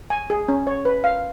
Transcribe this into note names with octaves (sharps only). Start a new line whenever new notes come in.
G#5
G#4
C#4
C#5
B4
F5